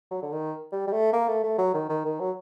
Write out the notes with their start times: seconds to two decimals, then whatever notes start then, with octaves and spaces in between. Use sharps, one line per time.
0.11 F#3
0.22 D3
0.32 D#3
0.72 G3
0.87 G3
0.92 A3
1.13 A#3
1.28 A3
1.44 A3
1.58 F#3
1.74 D#3
1.89 D#3
2.05 D#3
2.20 F#3